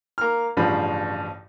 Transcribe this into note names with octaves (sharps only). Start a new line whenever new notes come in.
A#3 F6
A1 G2 C#3 F3 B5